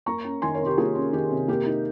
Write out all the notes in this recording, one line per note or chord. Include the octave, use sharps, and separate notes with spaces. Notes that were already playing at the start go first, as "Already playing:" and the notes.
A#3 A#5 C#6
C#4
D#3 G#5 C6
A#4 C#5
C3
G4 A#4
A#3 F4 G#4
C#4
D#3 G4
C3
A#3 G4
D#4